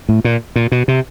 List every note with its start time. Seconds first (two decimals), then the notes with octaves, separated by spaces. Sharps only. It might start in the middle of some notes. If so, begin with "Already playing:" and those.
0.09 A2
0.25 A#2
0.56 A#2
0.72 B2
0.88 C3